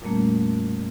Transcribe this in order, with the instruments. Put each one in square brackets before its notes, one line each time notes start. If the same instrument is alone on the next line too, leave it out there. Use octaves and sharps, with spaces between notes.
[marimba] F2 A#2 G3 A3 A#3 C#4